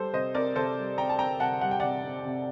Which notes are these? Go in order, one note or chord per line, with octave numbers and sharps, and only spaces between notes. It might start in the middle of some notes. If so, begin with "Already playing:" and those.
Already playing: G3 A4 C5
C3 C5 D#5
C4 A#4 D5
C3 A4 C5
G3
C3 G5 A#5
A5
C4 G5 A#5
C3 F#5 A5
G3 F#5
G5
C3 D5 F#5
C4
C3